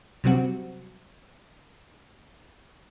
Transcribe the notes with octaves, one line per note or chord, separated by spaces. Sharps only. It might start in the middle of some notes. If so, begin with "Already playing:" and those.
C3 F#3 G3 C4 F#4